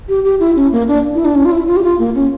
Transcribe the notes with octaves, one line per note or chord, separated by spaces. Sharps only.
G4
G4
E4
C#4
A#3
D4
E4
D4
C#4
F4
E4
F4
G4
F4
A#3
C#4